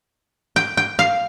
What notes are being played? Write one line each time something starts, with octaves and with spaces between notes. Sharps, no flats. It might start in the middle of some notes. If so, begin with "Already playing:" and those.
G5
G5
F5